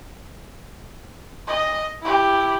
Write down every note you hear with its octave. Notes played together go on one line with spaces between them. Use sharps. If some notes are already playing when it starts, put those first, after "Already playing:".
D#5
E4 G4